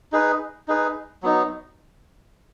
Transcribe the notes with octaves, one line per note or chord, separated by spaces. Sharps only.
D#4 G#4 B4
D#4 G#4 B4
F#3 B3 D#4